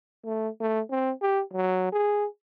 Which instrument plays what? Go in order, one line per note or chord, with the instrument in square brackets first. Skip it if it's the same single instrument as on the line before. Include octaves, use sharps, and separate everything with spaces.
[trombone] A3
A3
C4
G4
F#3
G#4